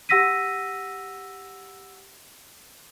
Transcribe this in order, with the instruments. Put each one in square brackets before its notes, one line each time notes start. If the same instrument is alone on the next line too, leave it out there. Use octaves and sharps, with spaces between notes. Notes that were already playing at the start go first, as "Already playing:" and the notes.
[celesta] G4 F#5 E6 A#6 B6 D#7